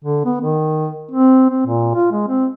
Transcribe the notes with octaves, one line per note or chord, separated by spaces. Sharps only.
D3
B3
D#3
C4
C4
A#2
F4
G#3
C4